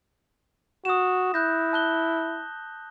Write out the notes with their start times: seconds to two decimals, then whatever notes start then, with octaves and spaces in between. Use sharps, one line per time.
0.85 F#4 D#6 E7
1.34 E4 F#6 G6 A#6
1.73 A5 F#6 G7